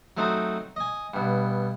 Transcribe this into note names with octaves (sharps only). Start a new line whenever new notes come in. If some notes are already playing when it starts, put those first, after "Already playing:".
F#3 A3 C4 D#4 F#4
D#5 G#5
G2 B2